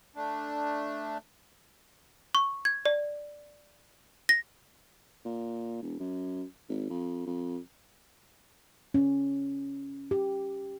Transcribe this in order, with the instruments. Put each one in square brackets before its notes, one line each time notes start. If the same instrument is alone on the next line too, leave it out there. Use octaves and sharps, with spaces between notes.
[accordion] A3 D4
[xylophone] C#6
G#6
D5
A#6
[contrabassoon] A#2
E1
F#2
G#1
F2
F2
[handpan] C#4
G4